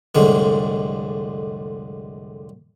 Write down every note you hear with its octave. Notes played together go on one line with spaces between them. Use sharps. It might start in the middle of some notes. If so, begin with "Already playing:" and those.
C2 F2 A2 D3 G#3